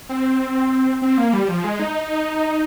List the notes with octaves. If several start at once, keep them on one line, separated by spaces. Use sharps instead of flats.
C4
C4
A#3
G3
F3
G#3
D#4